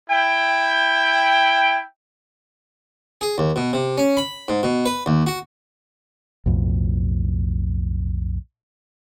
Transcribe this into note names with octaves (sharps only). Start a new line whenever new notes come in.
E4 G5
G#4
D#2
B2
C3
C#4
B5
G#2
B2
B4
D#2
F#4
B1 F2 A2